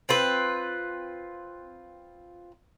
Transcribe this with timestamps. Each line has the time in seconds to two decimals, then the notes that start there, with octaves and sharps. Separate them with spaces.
0.09 C4 F4 B4